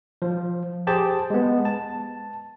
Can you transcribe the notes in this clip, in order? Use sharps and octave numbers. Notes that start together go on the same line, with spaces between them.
F3
G4 G#4 C5 A5
G#3 B3
A5